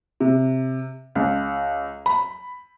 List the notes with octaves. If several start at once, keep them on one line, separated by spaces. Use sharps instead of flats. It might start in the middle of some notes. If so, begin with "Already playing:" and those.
C3
C#2
B5